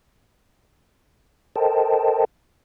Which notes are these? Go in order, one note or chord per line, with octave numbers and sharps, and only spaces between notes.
A4 A#4 C5 D#5 G5 A5